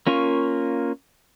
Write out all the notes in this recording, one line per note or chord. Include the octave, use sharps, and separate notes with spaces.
A#3 C#4 F4 A#4 C#6